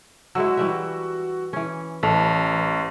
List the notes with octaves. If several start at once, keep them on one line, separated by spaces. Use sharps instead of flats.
F#3 G#3 E4 F#4 E6
E3 G3 E5
E3 C#4
A1 A4 B4